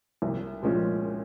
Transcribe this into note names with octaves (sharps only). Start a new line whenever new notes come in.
C2
A#2 F3 G#3 C#4